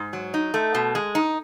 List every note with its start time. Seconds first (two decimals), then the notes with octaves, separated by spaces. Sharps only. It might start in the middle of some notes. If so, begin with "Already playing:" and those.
Already playing: G#2
0.13 F#3
0.34 D#4
0.54 A3
0.75 B2
0.95 G#3
1.15 D#4